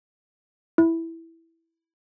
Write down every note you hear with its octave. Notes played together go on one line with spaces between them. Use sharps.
E4